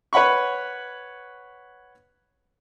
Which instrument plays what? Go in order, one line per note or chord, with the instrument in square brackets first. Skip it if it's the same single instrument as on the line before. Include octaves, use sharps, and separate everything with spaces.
[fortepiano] B4 C#5 F#5 B5 C#6